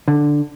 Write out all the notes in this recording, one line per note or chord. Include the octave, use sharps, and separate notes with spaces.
D3